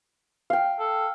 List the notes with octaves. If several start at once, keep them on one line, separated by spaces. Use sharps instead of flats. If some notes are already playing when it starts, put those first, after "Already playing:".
F5 G5
A4